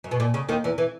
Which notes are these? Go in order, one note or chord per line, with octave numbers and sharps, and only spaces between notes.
F#2
B2
A#2
C#3
D#2 D#3
E2 E3
E3